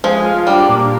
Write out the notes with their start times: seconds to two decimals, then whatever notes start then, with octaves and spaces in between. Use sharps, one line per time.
0.04 F3 G#3
0.26 F4
0.47 G3 D4
0.69 A#2